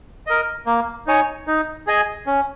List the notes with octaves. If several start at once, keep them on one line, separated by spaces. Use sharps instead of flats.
A#4 D#5
A#3
D#4 C#5 G#5
D#4
G#4 D#5 G#5
C#4